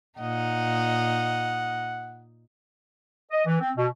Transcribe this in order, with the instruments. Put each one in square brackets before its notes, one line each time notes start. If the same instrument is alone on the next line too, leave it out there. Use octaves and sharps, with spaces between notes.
[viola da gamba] A#2 D#4 D#5 [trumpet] F#5
[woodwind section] D#5
E3
C4
B2